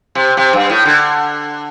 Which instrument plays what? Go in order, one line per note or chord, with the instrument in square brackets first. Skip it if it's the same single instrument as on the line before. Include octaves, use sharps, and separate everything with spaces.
[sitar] C3
C3
G2
A2
D3